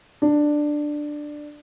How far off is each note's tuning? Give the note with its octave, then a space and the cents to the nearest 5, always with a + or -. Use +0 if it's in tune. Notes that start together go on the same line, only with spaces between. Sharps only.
D4 +10